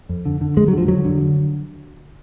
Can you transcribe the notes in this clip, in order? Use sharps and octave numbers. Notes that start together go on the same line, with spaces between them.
F2
D3
D3
F2 G#3
F#3
D3 F3
F2 F#3
D3